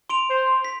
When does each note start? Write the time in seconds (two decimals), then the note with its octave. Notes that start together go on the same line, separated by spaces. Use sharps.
0.10 C6 D7 F7
0.29 C5
0.65 B6